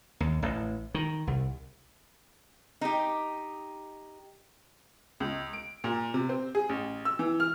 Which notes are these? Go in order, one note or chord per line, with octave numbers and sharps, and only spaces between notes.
D#2
A1
D#3
C2
D#4 G4
C#2
D7
A#2
C3
C4
G#4
A1
E6
E3
F6